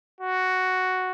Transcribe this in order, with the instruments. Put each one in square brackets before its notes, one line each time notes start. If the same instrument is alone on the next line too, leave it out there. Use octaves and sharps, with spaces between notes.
[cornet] F#4